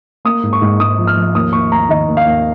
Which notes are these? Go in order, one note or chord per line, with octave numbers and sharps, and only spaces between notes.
A#3 D#6
G#2
C#6
G#2
G#2 D#6
F3
F6
F3
D#2 D#6
D#2 C#6
D#2 A#5
D#3 D#5
D#2
F5
D#2